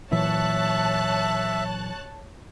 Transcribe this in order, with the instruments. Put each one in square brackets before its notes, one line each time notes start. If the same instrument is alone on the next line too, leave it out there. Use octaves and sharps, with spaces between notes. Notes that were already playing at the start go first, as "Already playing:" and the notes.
[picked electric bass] A#2 E3 F#3 [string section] C#5 A5 F#6 [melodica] E5